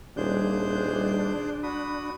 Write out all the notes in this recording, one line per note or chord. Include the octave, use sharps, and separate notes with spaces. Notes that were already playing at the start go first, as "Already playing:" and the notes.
D#1 G3 D4 G#4 C5 G6
F#4 B5 D#6